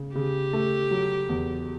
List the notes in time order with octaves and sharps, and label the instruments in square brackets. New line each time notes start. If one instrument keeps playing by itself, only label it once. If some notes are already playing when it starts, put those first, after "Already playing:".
Already playing: [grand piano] C#3
[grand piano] C#3 [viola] G4
[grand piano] A3
F#3
E2